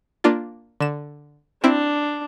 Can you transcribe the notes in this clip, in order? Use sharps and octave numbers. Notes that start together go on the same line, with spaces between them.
A#3 D4 F4
D3 E7
C4 D4 E4 E5